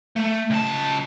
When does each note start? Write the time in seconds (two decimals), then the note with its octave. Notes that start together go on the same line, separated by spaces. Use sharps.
0.16 A3
0.50 C#2 A5